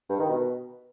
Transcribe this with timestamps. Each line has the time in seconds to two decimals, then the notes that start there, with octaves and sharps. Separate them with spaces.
0.09 G2
0.19 D#3
0.29 B2